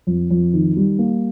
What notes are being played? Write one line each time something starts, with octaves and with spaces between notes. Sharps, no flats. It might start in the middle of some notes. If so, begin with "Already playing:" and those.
F2
F2
D#3
G3
A#3